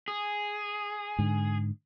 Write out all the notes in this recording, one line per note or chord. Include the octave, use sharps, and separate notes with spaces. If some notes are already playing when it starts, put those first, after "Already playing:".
G#4
G#2 D3